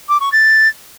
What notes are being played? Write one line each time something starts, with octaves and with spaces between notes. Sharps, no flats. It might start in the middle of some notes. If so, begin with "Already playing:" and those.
D6
C#6
A6